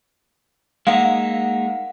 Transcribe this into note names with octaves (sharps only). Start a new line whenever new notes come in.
G#3 A#3 D#4 F5 F#5